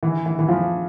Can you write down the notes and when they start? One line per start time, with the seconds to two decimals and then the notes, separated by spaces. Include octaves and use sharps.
0.03 E3
0.26 E3
0.39 E3
0.48 F3